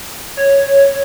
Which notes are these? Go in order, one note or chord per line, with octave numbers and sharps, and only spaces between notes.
C#5